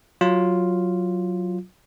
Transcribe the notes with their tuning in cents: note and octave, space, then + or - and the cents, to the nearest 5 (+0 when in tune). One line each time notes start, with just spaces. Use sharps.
F#3 -5 F4 +0